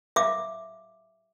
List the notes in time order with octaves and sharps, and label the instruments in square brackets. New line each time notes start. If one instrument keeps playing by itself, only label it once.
[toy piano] E5 F5 D6